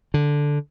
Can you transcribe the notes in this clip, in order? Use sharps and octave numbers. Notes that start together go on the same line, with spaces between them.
D3